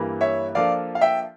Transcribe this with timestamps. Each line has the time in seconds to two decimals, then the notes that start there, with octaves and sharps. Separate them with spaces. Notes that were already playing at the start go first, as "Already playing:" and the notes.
Already playing: G2 E3 G3 A#3
0.21 C#5 E5
0.55 F3 A#3 D4 F4 A4 D5 F5
0.95 F5
1.01 E5 G5